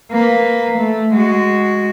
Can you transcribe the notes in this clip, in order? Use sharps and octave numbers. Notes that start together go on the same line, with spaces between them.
A#3 B4
A3
G#3 F#4